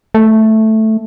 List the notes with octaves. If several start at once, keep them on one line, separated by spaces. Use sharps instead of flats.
A3